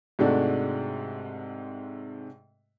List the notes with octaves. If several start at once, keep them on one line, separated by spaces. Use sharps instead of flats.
G#2 C3 G#3 A3 D4 F#4